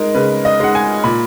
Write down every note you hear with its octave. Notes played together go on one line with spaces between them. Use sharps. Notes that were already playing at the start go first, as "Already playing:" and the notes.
Already playing: G#3 D#4 A#4
C#3 B4
D#5
G#3 D#4 F#5
G#5
A#2 B5